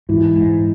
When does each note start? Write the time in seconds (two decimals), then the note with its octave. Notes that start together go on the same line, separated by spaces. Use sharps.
0.09 G#2 E3
0.36 G#2